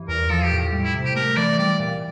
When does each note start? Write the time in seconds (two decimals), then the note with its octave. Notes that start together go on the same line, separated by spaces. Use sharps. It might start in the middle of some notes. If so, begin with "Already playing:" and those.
Already playing: G2 E3
0.08 E2 A#4
0.30 F3 A4
0.44 G4
0.52 A2
0.73 G3
0.84 E4
0.94 C3
1.05 G4
1.15 A3 A#4
1.37 E3 D5
1.59 G3 D5
1.80 A#2